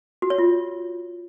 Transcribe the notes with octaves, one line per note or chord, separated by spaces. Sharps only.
F#4
C#5
F4